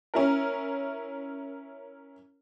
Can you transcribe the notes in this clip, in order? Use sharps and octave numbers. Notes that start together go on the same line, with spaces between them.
C#4 E4 A#4